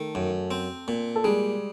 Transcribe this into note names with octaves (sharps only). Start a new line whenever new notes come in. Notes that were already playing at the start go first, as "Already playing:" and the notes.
Already playing: D#3 A3 A4
F#2
C4
A#2
A4
G3 G#3 G#4